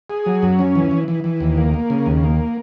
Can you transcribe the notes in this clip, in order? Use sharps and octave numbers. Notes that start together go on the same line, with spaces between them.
G#4
F#3
F#2
C#4
E3
E3
E3
E3
D#2
A#3
A#3
C#3
D#2
A#3